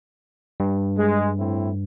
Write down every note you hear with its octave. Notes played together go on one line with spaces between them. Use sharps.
G2
G#3
A2 C4 E4